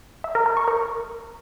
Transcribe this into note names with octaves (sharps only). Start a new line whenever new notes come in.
E5
A#4
A#4
C#6
A#4